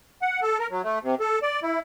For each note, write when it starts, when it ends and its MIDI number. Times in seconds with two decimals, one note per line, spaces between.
0.22 0.40 78
0.42 0.58 69
0.59 0.67 70
0.71 0.82 54
0.83 0.99 57
1.03 1.15 48
1.20 1.39 69
1.42 1.60 74
1.63 1.79 64